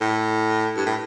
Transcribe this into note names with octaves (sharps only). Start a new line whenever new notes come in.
A2
G2
A2